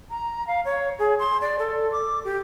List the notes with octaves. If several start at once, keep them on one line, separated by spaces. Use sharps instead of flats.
A#5
F5
C#5
G#4
C6
D5
A4
D6
G4